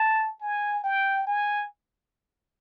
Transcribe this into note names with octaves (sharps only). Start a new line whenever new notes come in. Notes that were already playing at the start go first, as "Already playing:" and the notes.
Already playing: A5
G#5
G5
G#5